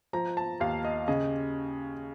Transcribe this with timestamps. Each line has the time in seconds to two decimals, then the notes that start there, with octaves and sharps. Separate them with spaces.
0.13 F3 A#5
0.37 A5
0.60 D#2 F5
0.85 D#5
1.08 C#3 D#5